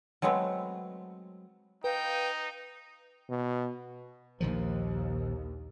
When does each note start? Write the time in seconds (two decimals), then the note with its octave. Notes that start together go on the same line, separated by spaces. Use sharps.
0.22 F#3 G#3 A3 B3 C4
1.84 D#4 B4 F5 G5
3.29 B2
4.41 A#1 D#2 D#3 F3